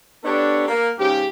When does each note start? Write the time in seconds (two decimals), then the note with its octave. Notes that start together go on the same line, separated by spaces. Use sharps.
0.24 B3 D4 G4 A4 C#5
0.67 A#3
0.98 G#2 C#3 G4